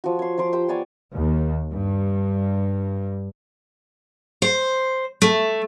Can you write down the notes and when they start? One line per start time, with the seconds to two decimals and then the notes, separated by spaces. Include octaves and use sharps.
0.04 F3 F#4
0.19 C#5 C6
0.38 F3 A#5 C6 D6
0.53 G4 C5 G5
0.68 B3 C#5 D5 G#5
1.14 D#2
1.71 G2
4.42 C5
5.22 A3